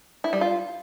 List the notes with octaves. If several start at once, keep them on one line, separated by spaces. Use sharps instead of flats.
E4
G3
F4